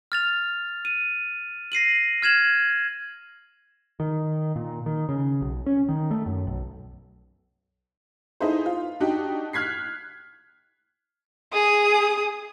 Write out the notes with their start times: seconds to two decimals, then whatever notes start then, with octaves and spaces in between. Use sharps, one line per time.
0.12 F6 A6 F7
0.85 D#7
1.72 A#6 C7 D#7 F#7
2.22 F6 G#6 E7 F#7
4.00 D#3
4.56 A#2
4.86 D#3
5.09 C#3
5.41 B1
5.66 C#4
5.89 D#3
6.11 A3
6.26 F#2
6.47 B1
8.40 D#4 E4 G#4 A4 B4 C5
8.66 F4
9.00 D4 D#4 F#4 G4
9.53 F6 F#6 G#6 B6 C7
11.52 G#4 D#6